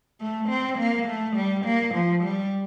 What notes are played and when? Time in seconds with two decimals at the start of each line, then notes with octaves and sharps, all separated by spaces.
0.21 A3
0.49 C4
0.78 A#3
1.07 A3
1.36 G3
1.65 A#3
1.94 F3
2.24 G3